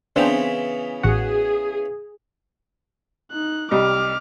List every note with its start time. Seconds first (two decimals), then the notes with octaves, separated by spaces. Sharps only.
0.16 C#3 E3 B3 C4 D4 C5
1.03 A1 F#4 G#4 F#5
3.32 D#4 F#6
3.71 C2 G3 D#5 D6 F6